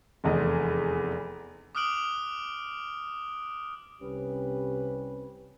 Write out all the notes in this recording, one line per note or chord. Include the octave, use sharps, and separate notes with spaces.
F1 E2 D#5
D6 D#6 F6 F#6 D7 F#7
C2 C3 C#4 G4 B4